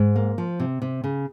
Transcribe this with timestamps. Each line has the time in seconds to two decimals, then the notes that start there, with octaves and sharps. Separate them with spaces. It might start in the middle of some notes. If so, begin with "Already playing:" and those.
Already playing: G#2
0.16 A#3
0.38 F3
0.60 C3
0.82 C3
1.04 C#3